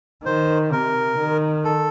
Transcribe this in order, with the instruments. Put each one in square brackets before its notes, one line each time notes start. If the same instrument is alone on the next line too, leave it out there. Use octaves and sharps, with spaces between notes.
[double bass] D#3 [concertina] C5
[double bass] C3 [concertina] A#4
[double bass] D#3
[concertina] A4